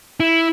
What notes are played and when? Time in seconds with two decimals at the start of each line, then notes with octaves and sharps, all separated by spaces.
0.20 E4